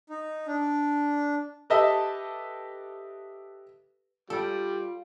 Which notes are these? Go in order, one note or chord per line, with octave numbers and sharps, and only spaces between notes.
D#4
D4
G4 A4 B4 D#5 E5 A5
G3 F4 A4